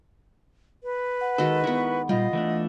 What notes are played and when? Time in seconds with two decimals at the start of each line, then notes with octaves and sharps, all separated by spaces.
0.83 B4
1.21 F#5
1.38 D#3 G#3 F#4 A4
1.64 D#3 B3 E4 F#4
2.09 A#2 G3 F4 D#5
2.33 E3 A3 D4